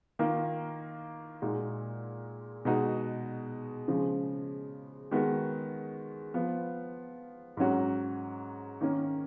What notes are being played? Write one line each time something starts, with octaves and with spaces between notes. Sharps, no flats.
D#3 A#3 F4
A#2 G#3 D#4 F#4
B2 G#3 D#4 F#4
C#3 F3 G#3
D#3 G#3 B3 F#4
F3 B3 F4
G#2 F#3 C#4 F#4
D#3 A#3 C#4